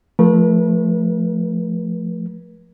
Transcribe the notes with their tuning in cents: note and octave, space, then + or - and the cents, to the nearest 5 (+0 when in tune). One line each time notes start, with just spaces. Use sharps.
F3 +0 A3 +0 B4 -45